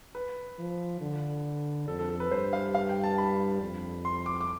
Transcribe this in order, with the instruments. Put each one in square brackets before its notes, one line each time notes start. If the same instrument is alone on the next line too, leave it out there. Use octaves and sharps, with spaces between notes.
[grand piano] B4
[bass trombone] F3
D3
[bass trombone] F2 [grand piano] A4
[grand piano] A4
A4
B4
[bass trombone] G2 [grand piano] C5
[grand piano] F5
F5
G5
A5
B5
[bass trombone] F2
[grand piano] C6
D6
D6